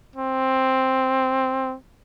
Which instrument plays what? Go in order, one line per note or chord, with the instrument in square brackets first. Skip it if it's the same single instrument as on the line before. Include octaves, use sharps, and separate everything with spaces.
[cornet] C4